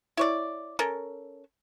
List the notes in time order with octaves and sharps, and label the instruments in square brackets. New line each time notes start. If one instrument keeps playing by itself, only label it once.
[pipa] E4 C#5 D5
C#4 A4 A#4